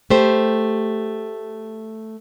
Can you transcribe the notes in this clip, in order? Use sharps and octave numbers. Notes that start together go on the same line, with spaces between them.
A3 G4 C5